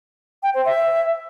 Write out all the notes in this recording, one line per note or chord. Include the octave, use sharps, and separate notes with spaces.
G5
C5
E5